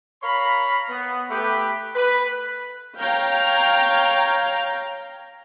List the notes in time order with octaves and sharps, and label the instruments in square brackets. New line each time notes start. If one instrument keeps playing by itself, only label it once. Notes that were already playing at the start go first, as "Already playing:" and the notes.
[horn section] A#4 C#5 F5 A#5 B5
B3
A3 G4 B4
B4
[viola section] C#5 F5 G5 A#5